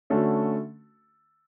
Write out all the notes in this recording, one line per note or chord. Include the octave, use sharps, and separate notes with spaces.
D3 A3 C#4 F#4 A4